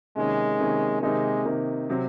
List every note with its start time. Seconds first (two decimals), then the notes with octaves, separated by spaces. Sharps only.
0.16 C3 D#3 G#3 A#3 C#4
0.59 C3 D#3 A#3 C#4
1.02 C3 D#3 G#3 A#3 D#4
1.45 C3 D#3 A#3 D#4
1.90 C3 F#3 C4